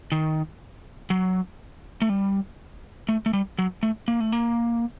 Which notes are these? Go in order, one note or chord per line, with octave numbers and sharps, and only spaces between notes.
D#3
F#3
A3
G3
A3
A3
G3
F#3
A3
A#3
A3
A#3